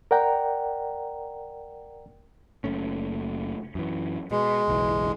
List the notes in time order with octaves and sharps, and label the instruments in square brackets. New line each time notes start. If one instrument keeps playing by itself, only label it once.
[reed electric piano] A#4 D5 F#5 G5 A#5
[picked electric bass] F#1 A3 C#4
F#2 E3
[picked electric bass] B2 [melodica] G#3
[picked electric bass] F#1 B1 E3